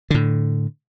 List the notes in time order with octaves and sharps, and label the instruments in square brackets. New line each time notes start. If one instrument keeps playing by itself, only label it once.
[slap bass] A2 D3